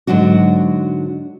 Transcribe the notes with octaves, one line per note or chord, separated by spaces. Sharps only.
G#2 D3 F#3 D4 F#4